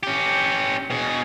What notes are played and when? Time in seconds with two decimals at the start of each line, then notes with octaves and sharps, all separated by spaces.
0.03 C#4 G4
0.90 B2 G#4